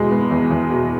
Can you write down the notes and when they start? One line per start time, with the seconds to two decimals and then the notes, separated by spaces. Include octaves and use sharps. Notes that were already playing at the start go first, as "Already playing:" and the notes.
Already playing: E2 B2 G#3
0.11 B3
0.31 E2
0.51 E2
0.70 B2